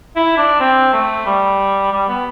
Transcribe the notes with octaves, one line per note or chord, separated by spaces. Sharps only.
E4
D4
C4
A3
G3
G3
B3